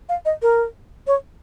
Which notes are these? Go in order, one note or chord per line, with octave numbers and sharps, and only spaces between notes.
F5
D#5
A#4
C#5